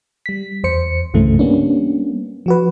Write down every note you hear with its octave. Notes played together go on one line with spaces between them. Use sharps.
G3 B6
E2 C5 C#7
C2 G2 C#3 E3 A3
G3 A#3 B3 C#4 D4
F3 F#4 B4